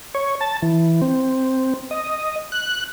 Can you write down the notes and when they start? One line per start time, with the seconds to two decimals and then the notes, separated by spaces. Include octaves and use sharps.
0.15 C#5
0.41 A5
0.62 E3
1.02 C4
1.91 D#5
2.52 F#6